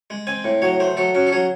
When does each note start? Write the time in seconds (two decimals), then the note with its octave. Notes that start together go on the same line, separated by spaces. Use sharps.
0.10 G#3
0.27 C4 G#5
0.44 A2
0.62 F#3 C#5
0.80 A3 C5
0.97 F#3 A4
1.15 C#4 F#4
1.27 A4
1.32 F#3 G#4